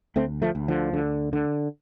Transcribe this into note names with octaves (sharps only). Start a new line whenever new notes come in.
D2 A3 C4
F3 A3
D2
D3 F3
D3
D3